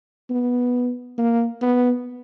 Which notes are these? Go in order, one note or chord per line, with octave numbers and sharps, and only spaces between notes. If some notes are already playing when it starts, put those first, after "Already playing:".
B3
A#3
B3